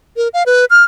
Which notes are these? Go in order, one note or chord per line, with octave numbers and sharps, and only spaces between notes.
A#4
F5
B4
F6